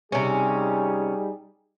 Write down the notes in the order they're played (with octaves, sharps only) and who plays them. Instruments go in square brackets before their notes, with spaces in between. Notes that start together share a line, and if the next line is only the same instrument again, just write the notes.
[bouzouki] C3 C#4 [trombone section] G3 D#4 G#4